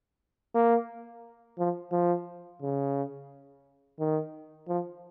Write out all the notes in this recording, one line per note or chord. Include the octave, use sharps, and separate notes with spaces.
A#3
F3
F3
C#3
D#3
F3